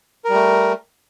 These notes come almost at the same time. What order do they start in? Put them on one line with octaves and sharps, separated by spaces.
A#4 G3 A3